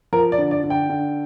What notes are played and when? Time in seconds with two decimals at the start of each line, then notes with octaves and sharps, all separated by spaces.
0.13 F3 A#4
0.32 D5
0.38 D3
0.51 D5
0.64 D3
0.70 G5
0.89 D3